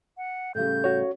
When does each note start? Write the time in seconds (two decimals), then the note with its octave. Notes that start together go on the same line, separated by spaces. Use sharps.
0.18 F#5
0.55 A2 C#3 G3 G6
0.84 F#4 C#5